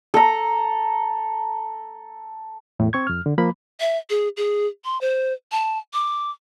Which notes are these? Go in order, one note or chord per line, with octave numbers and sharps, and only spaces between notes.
A4 A#5
E2 A2
C4 C#6 G#6
F2 F6
D3
F3 A#3 B5
E5
G#4
G#4
C6
C5
A5
D6